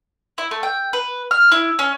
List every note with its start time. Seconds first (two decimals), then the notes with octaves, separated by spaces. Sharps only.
0.38 E4
0.51 A3
0.63 G5
0.93 B4
1.31 F6
1.52 E4
1.79 C#4